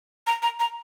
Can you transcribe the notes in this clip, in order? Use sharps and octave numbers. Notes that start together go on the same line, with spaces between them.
A#5
A#5
A#5